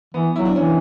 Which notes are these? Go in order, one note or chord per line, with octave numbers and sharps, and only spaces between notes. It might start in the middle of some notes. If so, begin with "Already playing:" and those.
E3 B3
F#3 E4
D4
E3 C#4